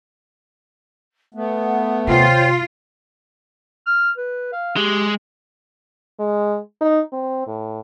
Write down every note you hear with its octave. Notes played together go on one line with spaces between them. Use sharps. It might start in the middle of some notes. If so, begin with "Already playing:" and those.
A3 B3 F#5
D#2 C3 F4 C5 C#5 G5
F6
B4
F5
G#3 G4
G#3
D#4
C4
A2